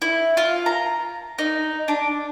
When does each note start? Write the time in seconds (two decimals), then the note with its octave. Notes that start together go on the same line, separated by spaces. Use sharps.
0.02 E4
0.37 F4
0.66 A#5
1.39 D#4
1.88 D4